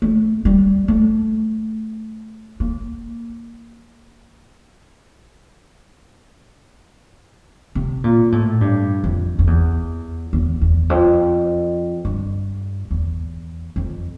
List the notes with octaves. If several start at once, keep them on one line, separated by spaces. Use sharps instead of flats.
A3
G3
A3
A#3
C3
A#2
A2
G2
F2
F2
E2
E2
E2
F2
G2
E2
F2